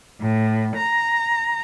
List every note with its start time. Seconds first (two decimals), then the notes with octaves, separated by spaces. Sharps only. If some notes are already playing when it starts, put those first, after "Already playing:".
0.20 A2
0.76 A#5